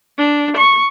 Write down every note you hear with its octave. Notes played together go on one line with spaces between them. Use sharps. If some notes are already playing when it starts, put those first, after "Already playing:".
D4
C#6